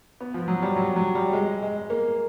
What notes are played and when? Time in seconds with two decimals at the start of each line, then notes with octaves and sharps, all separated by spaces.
0.20 B3
0.34 F3
0.48 F#3
0.63 G3
0.76 F#3
0.96 F#3
1.15 G3
1.33 G#3
1.63 G#3
1.90 A#3